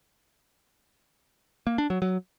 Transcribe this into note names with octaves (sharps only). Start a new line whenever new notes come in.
A#3
D4
F#3
F#3